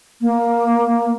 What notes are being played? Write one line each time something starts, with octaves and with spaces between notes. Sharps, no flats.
A#3